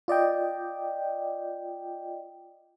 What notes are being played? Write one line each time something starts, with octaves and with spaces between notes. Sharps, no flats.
F4 D5 D#5 G5